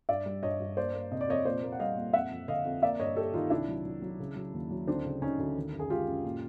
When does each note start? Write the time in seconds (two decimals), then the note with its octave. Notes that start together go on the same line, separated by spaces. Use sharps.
0.09 G2 D5 E5
0.26 G3
0.43 G2 C#5 D#5
0.60 G2
0.77 A#3 C5 D5
0.94 A#3
1.12 C3 D#5
1.21 D5
1.28 F2 C#5 D#5
1.45 A#2 C5 D5
1.62 A#3
1.72 F#5
1.79 G3 D#5 F5
1.97 A#2
2.13 F2 E5 F#5
2.31 F2
2.48 D3 D#5 F5
2.65 F2
2.82 A#3 D5 E5
2.99 G2 C#5 D#5
3.17 A#3 G4 A4
3.34 D#3 D#4 F4
3.50 C2 D4 E4
3.68 F#3
3.85 F#3
4.02 F#3
4.19 C#3
4.36 F#3
4.54 D#2
4.71 F#3
4.87 D2 C4 D4
5.05 C#3
5.22 D2 C#4 D#4
5.39 D2
5.56 D#3
5.73 F#2
5.79 G#4
5.90 G#3 F4 G4
6.08 F#2
6.25 A#2